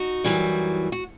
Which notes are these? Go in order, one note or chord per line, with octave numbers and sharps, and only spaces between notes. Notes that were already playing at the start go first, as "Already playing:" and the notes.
Already playing: D#4 F#4
F#2 E3 G3
F#4